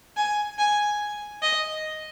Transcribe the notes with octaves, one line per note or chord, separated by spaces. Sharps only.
G#5
G#5
D#5